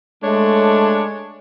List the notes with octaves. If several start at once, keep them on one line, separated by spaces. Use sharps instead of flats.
G#3 A3 D4 C#5